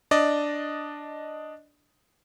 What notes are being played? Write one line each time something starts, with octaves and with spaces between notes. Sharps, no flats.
D4 D5 D#5